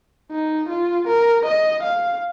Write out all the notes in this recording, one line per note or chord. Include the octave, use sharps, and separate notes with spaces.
D#4
F4
A#4
D#5
F5